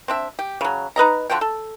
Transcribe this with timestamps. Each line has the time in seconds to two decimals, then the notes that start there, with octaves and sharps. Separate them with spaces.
0.08 C4 D4 E5
0.39 G4
0.61 C#3 F#3
0.96 D#4 B4 D#5 A#5
1.30 D3 F3 F#4 G5
1.41 A4